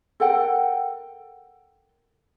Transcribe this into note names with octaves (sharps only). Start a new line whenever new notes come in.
A4 A#4 F#5 G5